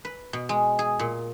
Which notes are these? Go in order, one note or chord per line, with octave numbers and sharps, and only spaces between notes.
B4
B2
G#3
G#4
A#2